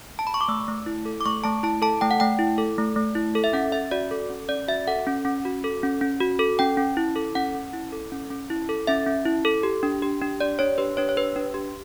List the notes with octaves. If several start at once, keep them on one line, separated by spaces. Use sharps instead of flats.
A5
B5
C#6
D6
A3 E6
A3
E4
A4
D6
A3 C#6
A3 A5
E4 A5
A4 A5
A3 G5
F#5
A3 G5
E4
A4
A3
A3
E4
A4
E5
C#4 F#5
C#4 E5
F#4 D5
A4
C#4
C#4 D5
F#4 E5
A4 F#5
C#4
C#4
F#4
A4
C#4
C#4
F#4
A4
C#4 G5
C#4
E4
A4
C#4 F#5
C#4
E4
A4
C#4
C#4
E4
A4
C#4 E5
C#4
E4
A4
G4
D4
G4
D4
G4 D5
D4 C#5
G4 B4
D4 C#5
C#5
G4 B4
D4
G4